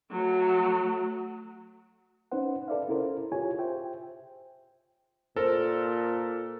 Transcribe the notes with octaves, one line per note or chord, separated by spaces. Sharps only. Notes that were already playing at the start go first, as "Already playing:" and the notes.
F#3 A3
C#4 D#4 B4 C5 F#5
A4 B4 D5 E5 F5
C#4 E4 A4 A#4 C5
F4 G4 G#4 C#5 G#5
F4 C5 E5 G5
A#2 A4 A#4 C5 A5